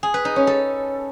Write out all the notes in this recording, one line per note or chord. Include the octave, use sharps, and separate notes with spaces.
G#4
B4
D#4
C#4
A4